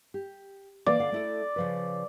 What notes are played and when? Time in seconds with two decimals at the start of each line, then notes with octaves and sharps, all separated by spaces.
0.14 G4
0.86 E3 A#3 D5
0.99 D3 F5
1.12 A3 E4 A4
1.56 C#3 F3 B4